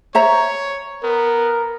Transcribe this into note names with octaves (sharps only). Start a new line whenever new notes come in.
C5 C#5 E5 A#5
B3 A#4